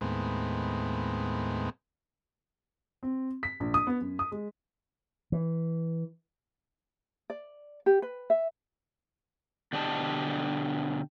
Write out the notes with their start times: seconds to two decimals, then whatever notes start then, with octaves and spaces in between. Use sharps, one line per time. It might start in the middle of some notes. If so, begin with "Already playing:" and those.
0.01 D#2 A2 G#3 B3 C4
3.03 C4
3.43 B6
3.60 A#1
3.74 D#6
3.87 B3
4.01 F#2
4.19 D#6
4.32 G#3
5.32 E3
7.30 D5
7.86 G4
8.02 B4
8.30 E5
9.73 B2 D3 D4 G4 D#5 A5